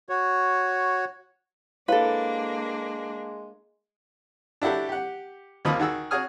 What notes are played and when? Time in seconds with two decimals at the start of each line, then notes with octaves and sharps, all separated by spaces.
0.09 F#4 C#5
1.88 G#3 A#3 D4 E4 A4 B4 C#5 F5
4.62 D4 E4 F#4 G4 A4
4.89 G4 F#5
5.65 D#2 F3 A#3 D#4 B5 D#6
5.80 D#3 F#4 G#4 E6
6.11 F#4 G#4 C#5 G#5 D#6 F6